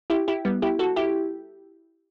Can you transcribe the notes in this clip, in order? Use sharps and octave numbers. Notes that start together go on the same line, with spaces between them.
E4 G4
E4 G4
G3 B3
E4 G4
F#4 A4
E4 G4